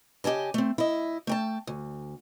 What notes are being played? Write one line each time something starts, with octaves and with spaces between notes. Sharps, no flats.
C#3 G4 D#5 G#5 A5
A3 C4
E4 D#5
A3 G5 A5
D2